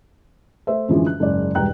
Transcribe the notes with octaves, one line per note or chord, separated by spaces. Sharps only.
A3 C5 E5
F#2 D3 E3 F3 G#3
F#6
F#1 G#2 D5
E1 G2 G5 A#5 F#6